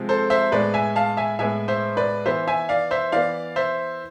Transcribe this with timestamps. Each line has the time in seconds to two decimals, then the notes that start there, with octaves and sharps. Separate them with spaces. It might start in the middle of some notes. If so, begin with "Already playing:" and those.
Already playing: C3 F3 G#3 C4
0.09 A4 C5
0.30 C5 E5
0.52 A2 G#3 B3 B4 D5
0.74 E5 G#5
0.96 F5 A5
1.17 E5 G#5
1.39 A2 G#3 B3 E5 G#5
1.68 C5 E5
1.97 B4 D5
2.26 E3 B3 C5 E5
2.48 E5 G#5
2.69 D5 F5
2.91 C5 E5
3.12 E3 B3 D5 F5
3.56 C5 E5